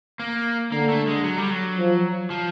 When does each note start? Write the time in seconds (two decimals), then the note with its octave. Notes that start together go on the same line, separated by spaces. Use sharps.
0.19 A#3
0.72 D3 A#3
0.89 A3
1.08 G#3
1.24 F#3
1.38 G3
1.51 F#3
1.78 F3
2.30 F3